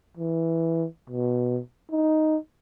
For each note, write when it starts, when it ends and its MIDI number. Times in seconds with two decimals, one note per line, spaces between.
0.17 0.86 52
1.09 1.60 47
1.91 2.37 63